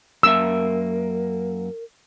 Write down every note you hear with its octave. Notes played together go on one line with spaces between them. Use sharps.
F#2 A#3 A#4 E5 E6